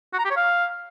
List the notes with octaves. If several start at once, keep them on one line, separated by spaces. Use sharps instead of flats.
F#4
A#5
G4
C#5
F5